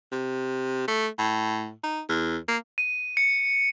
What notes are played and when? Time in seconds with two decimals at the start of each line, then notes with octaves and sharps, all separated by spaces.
0.12 C3
0.88 A3
1.18 A2
1.84 D#4
2.08 E2
2.48 A#3
2.78 D#7
3.17 C#7